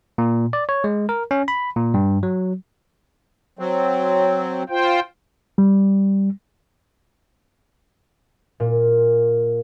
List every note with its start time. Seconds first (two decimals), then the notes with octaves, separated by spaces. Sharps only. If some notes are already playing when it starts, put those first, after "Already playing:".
0.18 A#2
0.53 D5
0.69 C#5
0.84 G#3
1.09 A#4
1.31 C#4
1.48 B5
1.76 A#2
1.94 G2
2.23 F#3
3.59 F#3 C4
4.69 F4 C5 G5
5.58 G3
8.60 A#2